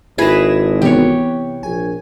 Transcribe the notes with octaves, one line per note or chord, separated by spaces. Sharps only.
G#1 E4 G#4 B4 G#6 A#6 E7
C3 E3 B3 G4 C#5
A#1 G#5